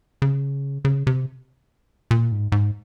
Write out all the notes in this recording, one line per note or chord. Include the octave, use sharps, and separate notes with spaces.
C#3
C#3
C3
A#2
G#2
G#2